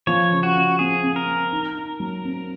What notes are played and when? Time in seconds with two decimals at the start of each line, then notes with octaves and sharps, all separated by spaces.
0.07 F3 C#5
0.31 C#3
0.43 F#4
0.55 C#3
0.79 C4 G#4
1.03 C4
1.16 A#4
1.28 C4
1.52 D#4
1.76 D#4
2.00 F#3
2.24 C4